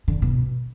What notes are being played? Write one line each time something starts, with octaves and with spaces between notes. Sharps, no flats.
D3
B2